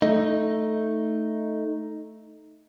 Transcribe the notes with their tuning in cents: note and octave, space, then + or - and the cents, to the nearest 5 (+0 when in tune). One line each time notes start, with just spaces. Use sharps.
A3 +0 D#4 +0